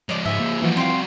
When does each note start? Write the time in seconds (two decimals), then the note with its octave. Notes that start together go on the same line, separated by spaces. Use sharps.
0.09 F3 G#3 C#5 D5 D6
0.25 G#2 E5 G#5
0.40 A#3
0.62 E3 F3 G3 F#4
0.77 C4 F5 G5 C6